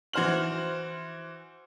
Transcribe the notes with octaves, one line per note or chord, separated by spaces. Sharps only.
E3 F#4 C5 F6 F#7